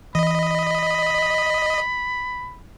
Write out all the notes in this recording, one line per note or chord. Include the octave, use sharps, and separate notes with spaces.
E3 D#5 B5